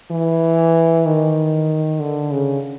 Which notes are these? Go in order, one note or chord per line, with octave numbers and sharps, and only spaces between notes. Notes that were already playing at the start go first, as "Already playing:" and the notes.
E3
D#3
D3
C#3